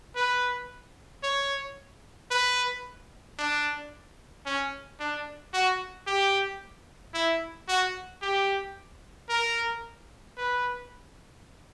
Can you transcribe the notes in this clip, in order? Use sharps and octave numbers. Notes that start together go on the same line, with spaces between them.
B4
C#5
B4
D4
C#4
D4
F#4
G4
E4
F#4
G4
A#4
B4